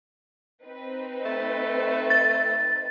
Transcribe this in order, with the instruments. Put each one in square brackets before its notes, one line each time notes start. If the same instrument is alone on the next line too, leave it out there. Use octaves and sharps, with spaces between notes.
[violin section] C4 D#4 B4
[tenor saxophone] A3
[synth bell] A6